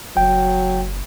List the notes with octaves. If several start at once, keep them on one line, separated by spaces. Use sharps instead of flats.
F#1 F#3 G5